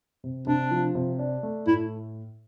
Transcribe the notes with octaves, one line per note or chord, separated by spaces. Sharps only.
C3
C3 D4
F3
C3
D4
A3
A2 E4